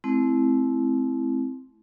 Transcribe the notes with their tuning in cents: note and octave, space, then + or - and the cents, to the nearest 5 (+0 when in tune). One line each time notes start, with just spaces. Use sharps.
A3 -40 C4 +0 E4 +0